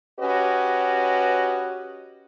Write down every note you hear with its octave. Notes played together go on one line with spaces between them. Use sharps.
C#4 F#4 G4 B4 D#5